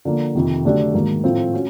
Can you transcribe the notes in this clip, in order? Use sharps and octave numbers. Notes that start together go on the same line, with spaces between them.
D3 F3 A#3
F2 C3 D#3
D3 F#3 A3 D4 G4
G#2 D#3 F#3 A#3
A2 F3 A3 C4 F4
C#4 F#4